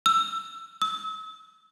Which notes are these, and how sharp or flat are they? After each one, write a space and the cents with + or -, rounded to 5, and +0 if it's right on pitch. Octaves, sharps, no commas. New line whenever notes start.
E6 +20
E6 -40